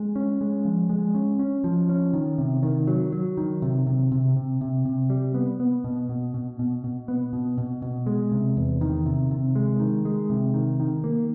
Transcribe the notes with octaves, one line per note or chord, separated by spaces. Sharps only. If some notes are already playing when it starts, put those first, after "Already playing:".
Already playing: G#3
C#4
G#3
F3
G#3
C#4
C#4
F3
C#4
D#3
C3
D#3
F#3
F#3
D#3
C3
C3
C3
C3
C3
C3
G3
B3
B3
B2
B2
B2
B2
B2
B3
B2
B2
B2
G#3
C3
E2
D#3
C3
C3
G#3
D#3
G#3
C3
D#3
D#3
A#3